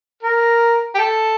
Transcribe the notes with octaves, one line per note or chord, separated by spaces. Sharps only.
A#4
G4
A4